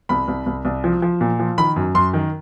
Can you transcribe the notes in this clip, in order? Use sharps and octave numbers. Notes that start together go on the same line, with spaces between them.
C2 B5
C2
C2
C2
F3
F3
A#2
F3
D#3 B5
F#2
F#2 C6
D#3